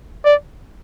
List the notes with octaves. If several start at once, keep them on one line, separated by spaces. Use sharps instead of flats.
D5